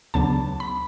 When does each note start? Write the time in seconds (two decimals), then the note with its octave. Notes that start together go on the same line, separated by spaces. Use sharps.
0.14 D2 C#3 F#3 B3 D4 A5
0.60 B5